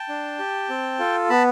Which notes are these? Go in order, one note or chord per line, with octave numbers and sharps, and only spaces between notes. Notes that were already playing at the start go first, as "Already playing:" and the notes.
Already playing: G5 A5
D4
G4
C4
F4 A4
B3 A5 B5